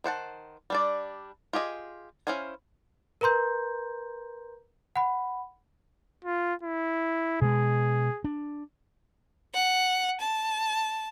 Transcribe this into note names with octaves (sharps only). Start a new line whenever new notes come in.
D#3 C5 F#5 A5
G3 D4 D5
F4 G4 G#4 D#5
C#4 E4 C5 F5 G#5
A#4 B4 A#5 C6 G6
F#5 B5
F4
E4
B2 G#3 G#4
D4
F#5
A5